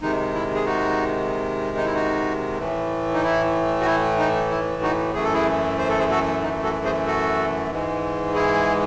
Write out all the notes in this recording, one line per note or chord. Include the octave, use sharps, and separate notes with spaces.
C3 D#3 G#3 D#4
E4
G#4
D#4 F#4
D#4
E4
D#4 F#4
A2 E3 A3
D#4
E4
F#4
E4
D#4
E4
D#4 F#4
F#2 E3 A3 G#4
A4
E4 G#4
C5
A4
G#4 C5
F#4 A4
D#4
F#4 A4
G#4 C5
F#4 A4
G#2 E3 G#3
E4 G#4